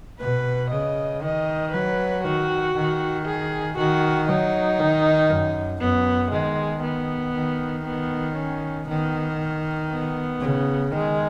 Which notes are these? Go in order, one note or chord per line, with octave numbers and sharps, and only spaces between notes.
B2 B4
C#3 D#5
D#3 D#5
F#3 B4
D#3 F#4
D#3
G#4
D#3 F#4
F#3 D#4
D#3
F#2
F#2 B3
D#3 G#3
B3
D#3
B3
C#4
D#3 B3
B3
C#3
D#3 G#3